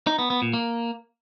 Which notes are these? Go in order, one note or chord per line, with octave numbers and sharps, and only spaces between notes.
D#4
B3
B3
A#2
A#3